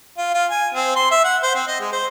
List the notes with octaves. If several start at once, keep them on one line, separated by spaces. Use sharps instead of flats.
F4
F4
G#5
C4
C6
E5
F#5
C5
C4
D#5
G#3
C5